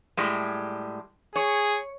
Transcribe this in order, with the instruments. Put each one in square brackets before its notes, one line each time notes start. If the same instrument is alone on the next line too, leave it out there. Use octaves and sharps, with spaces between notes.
[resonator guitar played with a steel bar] A2 G3 G#3
[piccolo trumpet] G#4 [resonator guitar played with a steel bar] C#5